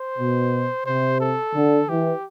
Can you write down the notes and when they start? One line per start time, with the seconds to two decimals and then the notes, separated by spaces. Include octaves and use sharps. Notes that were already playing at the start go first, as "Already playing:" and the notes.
Already playing: C5
0.18 B2
0.86 C3 C5
1.20 A4
1.55 D3
1.89 E3 G4